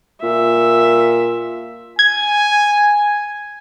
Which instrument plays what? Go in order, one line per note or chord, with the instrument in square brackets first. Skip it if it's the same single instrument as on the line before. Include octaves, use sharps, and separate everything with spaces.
[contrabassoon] A#2 [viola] E5
[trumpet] G#5 [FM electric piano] G#6